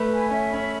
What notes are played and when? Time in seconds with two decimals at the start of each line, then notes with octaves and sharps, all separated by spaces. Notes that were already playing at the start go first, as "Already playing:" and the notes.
Already playing: A3 B4
0.12 G#5
0.30 C#4 E5
0.50 C#4 B5